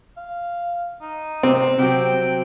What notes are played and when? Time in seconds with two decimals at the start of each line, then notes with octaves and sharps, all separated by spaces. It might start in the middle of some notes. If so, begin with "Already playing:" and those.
0.17 F5
1.02 D#4
1.43 C3 C4
1.79 C3 F#3 G5